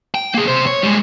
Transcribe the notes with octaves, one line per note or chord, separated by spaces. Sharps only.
G5
A#3 G#4
C3 C5
C#5
G3 G#3